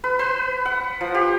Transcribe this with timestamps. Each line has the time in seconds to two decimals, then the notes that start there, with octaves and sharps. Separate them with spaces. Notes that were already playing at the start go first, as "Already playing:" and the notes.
0.04 B4
0.19 B4
0.65 F#5
1.01 F3
1.15 G4